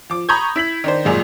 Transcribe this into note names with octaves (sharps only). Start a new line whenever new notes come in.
F3 D6
A#5 B5 C#6 D#6 G6 G#6
E4 B6 F#7
D#3 D4 C5
G#1 F#2 A#2 G3 G#3